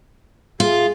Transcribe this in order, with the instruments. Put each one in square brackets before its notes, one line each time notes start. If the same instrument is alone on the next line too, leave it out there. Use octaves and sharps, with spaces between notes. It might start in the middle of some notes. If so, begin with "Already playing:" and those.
[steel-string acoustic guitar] F4 [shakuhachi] G#4